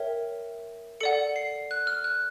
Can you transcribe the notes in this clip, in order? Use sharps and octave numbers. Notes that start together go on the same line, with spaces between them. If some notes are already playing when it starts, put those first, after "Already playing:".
Already playing: A#4 C#5 E5 G5
A4 D5 F#5 C#7
C7
F#6
F6
F#6